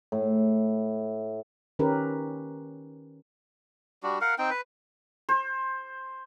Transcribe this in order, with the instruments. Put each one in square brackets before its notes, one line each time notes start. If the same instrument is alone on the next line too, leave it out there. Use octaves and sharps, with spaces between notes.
[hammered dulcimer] A2
[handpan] D#3 C#4 G4 A#4 B4
[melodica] G3 D4 F#4
A#4 F5 F#5
C4 D#4 G5
B4
[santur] C5